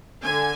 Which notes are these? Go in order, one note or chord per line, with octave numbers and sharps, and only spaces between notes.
D3 G#5